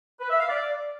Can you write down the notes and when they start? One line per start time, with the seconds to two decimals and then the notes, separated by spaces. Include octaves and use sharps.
0.20 B4
0.30 E5
0.40 F5
0.49 D5